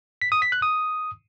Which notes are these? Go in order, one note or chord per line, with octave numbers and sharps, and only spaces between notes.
B6
D#6
B6
F#6
D#6